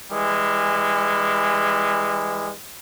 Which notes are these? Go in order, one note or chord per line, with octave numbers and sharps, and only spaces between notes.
E3 G3 G#3